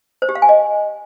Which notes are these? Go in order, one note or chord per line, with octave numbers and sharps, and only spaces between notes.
C5
G4
F5
G#5
D#5